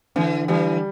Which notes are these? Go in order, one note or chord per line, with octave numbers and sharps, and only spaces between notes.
D3 E3
E3 G3